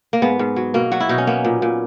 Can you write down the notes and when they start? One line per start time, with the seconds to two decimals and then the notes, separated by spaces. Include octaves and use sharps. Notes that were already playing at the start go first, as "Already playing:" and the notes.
0.13 A#3
0.22 G#2 B3
0.39 G#2
0.56 F#3
0.74 B2 A#3
0.92 F#3 F#4
1.00 E4
1.09 B2 D#4
1.18 C#4
1.27 A#3 B3
1.45 A#2
1.62 A#2